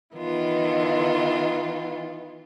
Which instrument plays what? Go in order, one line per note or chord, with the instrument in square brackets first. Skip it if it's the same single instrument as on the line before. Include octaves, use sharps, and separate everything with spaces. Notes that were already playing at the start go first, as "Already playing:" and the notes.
[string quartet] D#3 E3 B3 F4